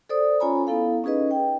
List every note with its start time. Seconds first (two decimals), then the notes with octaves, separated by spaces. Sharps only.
0.09 A4 C5 D5 D#6
0.40 C#4 F4 C#5 G#5 A#5 B5
0.67 B3 E4 A4 F5
1.04 C#4 D#4 G#4 B4 D#5
1.31 G5